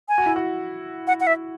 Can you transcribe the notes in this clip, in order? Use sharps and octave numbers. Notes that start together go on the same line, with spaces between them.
G#5
F#4
E4
F#4
F#5
F#5
E5